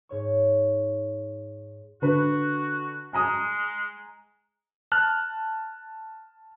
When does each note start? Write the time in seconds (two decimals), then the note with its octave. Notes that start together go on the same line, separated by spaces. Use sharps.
0.09 G#2 C#5 C#6
2.02 D3 F#4 B4
3.13 G#3 G#5 A#5 D#6
4.92 A5 F6 F#6